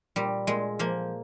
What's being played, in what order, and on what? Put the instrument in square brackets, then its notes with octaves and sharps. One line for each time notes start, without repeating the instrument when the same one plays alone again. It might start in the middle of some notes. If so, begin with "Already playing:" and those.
[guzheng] A#2 G3
A#2 G#3
F3 A#3